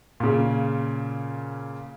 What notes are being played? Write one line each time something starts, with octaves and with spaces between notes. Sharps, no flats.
A#2 C#3